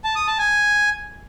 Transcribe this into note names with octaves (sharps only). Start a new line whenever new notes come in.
A5
D#6
A5
G#5